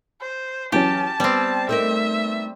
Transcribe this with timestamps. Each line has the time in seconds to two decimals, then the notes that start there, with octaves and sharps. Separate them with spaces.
0.21 C5
0.72 E3 F#3 C#4 G4 A5
1.20 G3 B3 C4
1.69 A3 D#4 A#4 E5